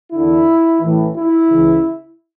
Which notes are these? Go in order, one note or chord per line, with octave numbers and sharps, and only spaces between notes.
E2 D3 E4
A1 A2 E3
E4
C#2 C#3 E3